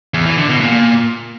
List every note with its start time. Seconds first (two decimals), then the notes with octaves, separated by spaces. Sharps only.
0.14 E2
0.26 E3
0.37 D3
0.49 B2
0.61 A#2